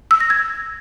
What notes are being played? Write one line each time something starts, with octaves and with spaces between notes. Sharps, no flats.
E6
A#6
G#6